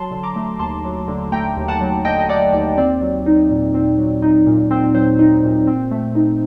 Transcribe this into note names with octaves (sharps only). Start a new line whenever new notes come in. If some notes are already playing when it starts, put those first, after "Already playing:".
Already playing: F#3 A5 C6
D3
A#5 D6
A3
D#2 A5 C6
F#3
D3
A3 G5 A#5
D#2
F#5 A5
F#3
D3 D#5 G5
D#5
A3 D5 F#5
D#2 D5
C4 D5
F#3
D#4
A#2
C4
F#3
D#4
A#2
C4
F#3 C5
D#4
A#2
C4
A3
D#4